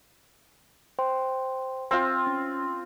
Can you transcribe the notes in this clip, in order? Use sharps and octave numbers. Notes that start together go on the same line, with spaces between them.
C5 G5 C6
C4 F4
C#4